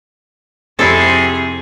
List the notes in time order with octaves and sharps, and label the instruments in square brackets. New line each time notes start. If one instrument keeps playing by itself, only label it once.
[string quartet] F2 C3 G#4 [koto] E4 A4